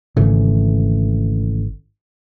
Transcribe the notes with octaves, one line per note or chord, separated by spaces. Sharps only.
G#1 C#3 E3 A3